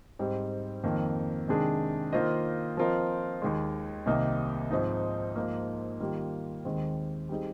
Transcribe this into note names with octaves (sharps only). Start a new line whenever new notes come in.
G#2 G3 C4
F2 D#3 A#3
C3 D#3 G#3 D4 G#4
D#3 A#3 F4 C5 D#5
F3 C4 F4 A#4 D#5
D#2 D#3 G#3
C2 C3 D#3 A#3 D#4
G#2 F3 C4 D#4
G#2 F3 A#3
D#3 G3 A#3 F4
D#2 D#3 G#3 C4
G3 C4 D#4 G#4